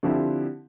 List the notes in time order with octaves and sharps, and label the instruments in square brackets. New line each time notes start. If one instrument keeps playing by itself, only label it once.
[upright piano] D3 F3 C4 E4 G4